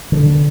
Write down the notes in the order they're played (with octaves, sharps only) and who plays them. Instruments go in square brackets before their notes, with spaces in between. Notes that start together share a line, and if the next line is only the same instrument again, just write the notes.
[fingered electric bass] D3